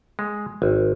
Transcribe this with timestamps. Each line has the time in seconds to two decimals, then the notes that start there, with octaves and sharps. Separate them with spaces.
0.19 G#3
0.62 G#1